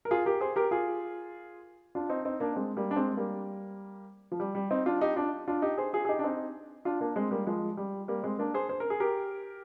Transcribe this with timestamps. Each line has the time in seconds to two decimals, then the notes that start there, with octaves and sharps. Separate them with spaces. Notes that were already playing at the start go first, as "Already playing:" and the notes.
0.05 A#4
0.11 F4 G#4
0.26 G4 A#4
0.41 G#4 C5
0.56 G4 A#4
0.71 F4 G#4
1.95 D4 F4
2.09 C4 D#4
2.25 C4 D#4
2.40 A#3 D4
2.56 G#3 C4
2.77 G3 A#3
2.91 D4
2.96 G#3 C4
3.17 G3 A#3
4.32 F3
4.40 G3
4.55 G3
4.71 C4 D#4
4.86 D4 F4
5.01 D#4 G4
5.16 D4 F4
5.48 D4 F4
5.62 D#4 G4
5.77 G#4 C5
5.93 F4 G#4
6.05 G#4
6.09 D#4 G4
6.19 D4
6.24 C4 D#4
6.85 D4 F4
7.00 A#3 D4
7.16 G#3 C4
7.31 G3 A#3
7.47 F3 G#3
7.77 G3
8.08 G3 A#3
8.23 G#3 C4
8.39 A#3 D4
8.54 G#4 C5
8.69 C5
8.80 A#4
8.90 G#4
9.00 G4 A#4